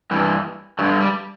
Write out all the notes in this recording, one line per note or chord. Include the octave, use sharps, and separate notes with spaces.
G2 E3
G2 D3 F#3
G3